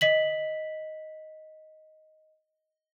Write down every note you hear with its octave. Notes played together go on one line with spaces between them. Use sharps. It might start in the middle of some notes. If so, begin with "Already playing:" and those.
D#5 B6 F#7